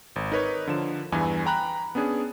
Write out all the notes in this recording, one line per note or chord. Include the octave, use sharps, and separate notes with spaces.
G#1
D#4 A#4 B4 C#5
D3 F3 E7
E2 G2 E3 G#5
G5 A#5 B5 F#6
B3 C#4 D4 G#4